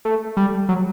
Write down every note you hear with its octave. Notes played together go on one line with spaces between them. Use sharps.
A3
G3
F#3